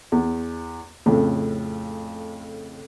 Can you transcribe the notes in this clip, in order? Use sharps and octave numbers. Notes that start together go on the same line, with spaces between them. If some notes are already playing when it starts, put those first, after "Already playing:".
E2
F2 A2 C#3